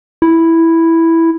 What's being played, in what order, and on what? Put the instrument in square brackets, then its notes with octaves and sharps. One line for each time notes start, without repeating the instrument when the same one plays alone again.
[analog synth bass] E4